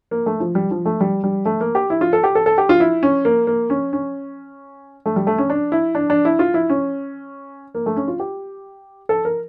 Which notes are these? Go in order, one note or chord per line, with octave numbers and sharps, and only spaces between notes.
A#3
A3
F3
G3
F3
A3
G3
G3
A3
A#3
G4
E4
F4
A4
G4
A4
A4
G4
F4
E4
C#4
A#3
A#3
C#4
C#4
A3
G3
A3
C#4
D4
E4
D4
D4
E4
F4
E4
C#4
A#3
A3
C#4
F4
G4
A4
A#4